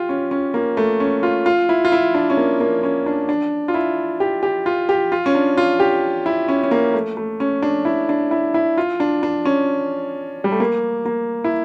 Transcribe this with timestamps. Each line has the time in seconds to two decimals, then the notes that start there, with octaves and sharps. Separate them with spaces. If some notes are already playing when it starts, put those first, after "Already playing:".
Already playing: F4 G4
0.09 C#4
0.31 C#4
0.54 A#3
0.77 A3
1.00 C#4
1.23 F4
1.46 F4
1.69 E4
1.85 F4
1.92 E4
2.15 D4
2.30 C#4
2.37 A#3
2.60 A#3
2.83 C#4
3.06 D4
3.29 D4
3.68 F4
3.74 E4
4.20 G4
4.43 G4
4.66 F4
4.89 G4
5.12 F4
5.26 C#4
5.35 D4
5.57 F4
5.80 G4
6.26 E4
6.49 C#4
6.63 C#4
6.71 A#3
6.94 A3
7.17 A3
7.40 C#4
7.62 D4
7.85 E4
8.09 D4
8.31 E4
8.54 E4
8.77 F4
9.00 D4
9.23 D4
9.45 C#4
10.44 G3
10.52 A3
10.60 A#3
11.05 A#3
11.44 E4